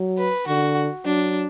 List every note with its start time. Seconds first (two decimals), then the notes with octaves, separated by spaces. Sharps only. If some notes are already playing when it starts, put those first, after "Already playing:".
Already playing: F#3
0.18 B4
0.47 D3 F#4
1.05 F#3 D4